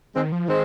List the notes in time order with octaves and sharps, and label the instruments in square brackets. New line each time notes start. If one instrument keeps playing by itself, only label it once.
[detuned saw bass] D#3 [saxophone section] G#3 C4
[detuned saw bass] F3
[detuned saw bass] D#3 [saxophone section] G#3 C4